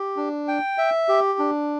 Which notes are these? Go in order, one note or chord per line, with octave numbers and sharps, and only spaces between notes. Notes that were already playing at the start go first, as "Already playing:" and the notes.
Already playing: G4
D4
G5
E5
G4
D4